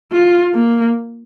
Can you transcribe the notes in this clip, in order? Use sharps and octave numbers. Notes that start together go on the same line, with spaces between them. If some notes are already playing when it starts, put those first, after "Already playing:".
F4
A#3